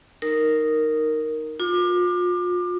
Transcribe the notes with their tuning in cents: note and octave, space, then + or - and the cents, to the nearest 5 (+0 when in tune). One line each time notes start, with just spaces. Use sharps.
D#4 +0 A#4 -5
F4 +35 D6 +30